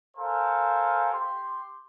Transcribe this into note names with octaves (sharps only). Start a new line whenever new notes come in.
A4 A#4 C5 F5 G#5
G4 C6